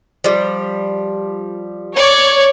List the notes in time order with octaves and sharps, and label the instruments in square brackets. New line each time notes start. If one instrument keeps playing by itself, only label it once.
[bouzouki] F3 G3
[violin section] C#5 [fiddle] D5